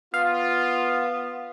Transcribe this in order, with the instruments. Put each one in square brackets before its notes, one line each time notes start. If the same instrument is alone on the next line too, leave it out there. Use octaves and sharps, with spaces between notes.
[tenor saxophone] B3 [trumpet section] F4 [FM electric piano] F5